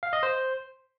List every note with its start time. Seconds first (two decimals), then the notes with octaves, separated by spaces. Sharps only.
0.03 F5
0.13 D#5
0.23 C5